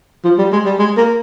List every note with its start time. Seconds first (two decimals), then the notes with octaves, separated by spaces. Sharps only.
0.24 F3
0.38 G3
0.52 G#3
0.65 G3
0.79 G#3
0.97 A#3